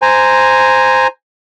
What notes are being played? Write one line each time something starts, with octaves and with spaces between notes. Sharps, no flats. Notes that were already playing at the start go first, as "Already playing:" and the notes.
C5 G#5 A#5